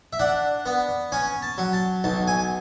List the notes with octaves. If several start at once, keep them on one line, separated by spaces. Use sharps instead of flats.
E5
D4 F#5
B3
C#4 G#5
A5
F#3
A5
B1 A5
G#5